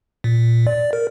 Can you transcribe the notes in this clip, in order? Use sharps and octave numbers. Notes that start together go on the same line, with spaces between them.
A#2
D5
A#4